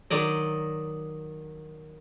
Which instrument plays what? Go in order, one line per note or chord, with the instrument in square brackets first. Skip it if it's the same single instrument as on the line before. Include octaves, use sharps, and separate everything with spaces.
[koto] D#3 F#3 D5 D#5